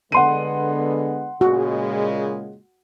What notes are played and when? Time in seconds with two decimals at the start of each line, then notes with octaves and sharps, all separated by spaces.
0.12 D3 G#3 B3 F#5 C6 D#7
1.41 A#2 C#3 G#3 F#4